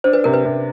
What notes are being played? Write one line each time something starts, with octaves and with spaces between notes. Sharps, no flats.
D4 C5
B4
C3 A#4
B4
C3